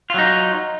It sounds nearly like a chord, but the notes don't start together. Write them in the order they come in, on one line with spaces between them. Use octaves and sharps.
F4 F#3 D#4